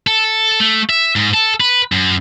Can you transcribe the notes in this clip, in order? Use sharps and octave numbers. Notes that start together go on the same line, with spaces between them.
A4
A3
E5
G#2
A4
B4
F#2